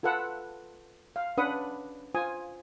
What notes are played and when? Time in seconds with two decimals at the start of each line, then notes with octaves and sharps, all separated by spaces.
0.03 F4 A4 B4 F#5 E6
1.16 F5
1.37 C#4 D4 B4 F#5 D#6
2.15 F4 C5 G#5 D#6